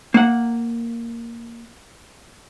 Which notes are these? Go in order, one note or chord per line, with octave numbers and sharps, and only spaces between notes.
A#3 F#5